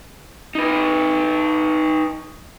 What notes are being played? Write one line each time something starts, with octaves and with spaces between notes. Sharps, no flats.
D#4 B4